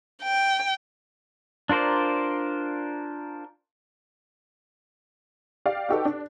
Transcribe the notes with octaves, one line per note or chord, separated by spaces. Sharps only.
G5
D4 F4 A#4 C5 D5
G4 D5 F5
D#4 F#4 G4 A4 B4
D4